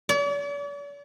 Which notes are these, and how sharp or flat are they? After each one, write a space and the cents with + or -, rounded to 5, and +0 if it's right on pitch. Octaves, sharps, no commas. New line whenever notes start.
D5 -45